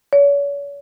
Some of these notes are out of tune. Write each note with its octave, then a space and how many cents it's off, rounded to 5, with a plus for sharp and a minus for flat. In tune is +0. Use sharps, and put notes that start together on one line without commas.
C#5 +40